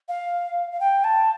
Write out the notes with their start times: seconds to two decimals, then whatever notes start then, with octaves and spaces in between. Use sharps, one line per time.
0.08 F5
0.71 F5
0.80 G5
1.04 A5